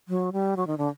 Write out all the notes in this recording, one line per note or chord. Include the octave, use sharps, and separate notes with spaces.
F#3
G3
F#3
D#3
D3